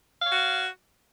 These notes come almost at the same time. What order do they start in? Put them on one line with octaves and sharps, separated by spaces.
F5 C#5 F#4